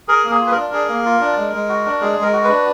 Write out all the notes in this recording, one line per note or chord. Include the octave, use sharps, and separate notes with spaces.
G#4 A#4
A#3
G#4
F4
B4
D4 A#4
G#4
A#3
F4
D4
G#3
G#3
F#4
D4
G#3 G#4
G#3
A#4
F#4
B4
D4